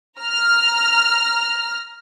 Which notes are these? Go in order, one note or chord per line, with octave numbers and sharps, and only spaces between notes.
A#5 F6